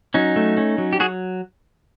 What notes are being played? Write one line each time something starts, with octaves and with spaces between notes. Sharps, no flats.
F#3 C#4 D#4
A3
C#4
F#3
G4
F#3 F#4 G#4